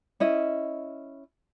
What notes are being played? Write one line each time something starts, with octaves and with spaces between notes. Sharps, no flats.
C#4 E4 D#5